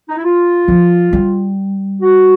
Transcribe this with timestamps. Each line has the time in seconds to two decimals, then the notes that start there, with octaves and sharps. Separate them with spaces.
0.09 D#4
0.17 E4
0.24 F4
0.68 F3
1.13 G3
2.01 F#4